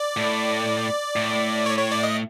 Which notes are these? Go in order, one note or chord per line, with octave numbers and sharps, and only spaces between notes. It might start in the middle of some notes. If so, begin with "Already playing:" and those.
Already playing: D5
A2
A2
C#5
C#5
D5
D#5